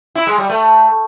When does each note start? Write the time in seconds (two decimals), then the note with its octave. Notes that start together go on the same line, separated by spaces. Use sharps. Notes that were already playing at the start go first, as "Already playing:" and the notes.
0.15 E4
0.27 G#3
0.38 G3
0.49 A3